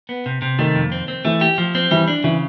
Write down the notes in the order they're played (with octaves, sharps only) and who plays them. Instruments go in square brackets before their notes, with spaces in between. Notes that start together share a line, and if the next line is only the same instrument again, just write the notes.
[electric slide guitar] B3
C3
C3
[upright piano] D#3 [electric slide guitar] A3
[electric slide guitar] F2
C4
C4
[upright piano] E3 [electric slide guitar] A3
[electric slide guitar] G4
F3
C4
[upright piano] E3 [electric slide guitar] G3
[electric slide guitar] D4
[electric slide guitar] C#3 [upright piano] E3